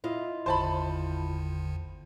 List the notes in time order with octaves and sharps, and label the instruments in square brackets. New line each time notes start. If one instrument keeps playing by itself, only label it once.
[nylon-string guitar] E4 F4 D#5
[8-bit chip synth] G#1 E2 D3 [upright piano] C5 A5 B5